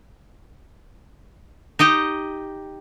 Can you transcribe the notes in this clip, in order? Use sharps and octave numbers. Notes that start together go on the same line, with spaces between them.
D#4 G4 D#5